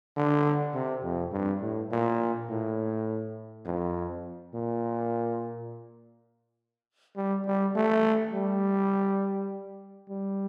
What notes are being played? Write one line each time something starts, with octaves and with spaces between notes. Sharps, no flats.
D3
C3
F2
G2
A2
A#2
A2
F2
A#2
G3
G3
A3
G3
G3